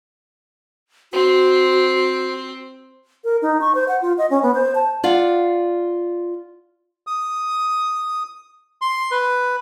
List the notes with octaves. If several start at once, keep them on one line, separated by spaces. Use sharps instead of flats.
C4 F#4
A#4
D#4
C#6
C5
F#5
F4
D#5
C#4
B3
C5
A5
F4 D5 F5 F#5
D#6
C6
B4